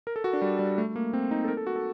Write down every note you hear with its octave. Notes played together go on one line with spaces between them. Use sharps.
A#4
A4
F#4
D4
G3
G3
A3
A#3
C4
D#4
A4
A#4
A4
F#4
A4